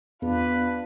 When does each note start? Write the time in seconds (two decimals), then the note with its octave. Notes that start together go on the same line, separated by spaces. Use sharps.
0.22 E2 B3 D4 F4 B4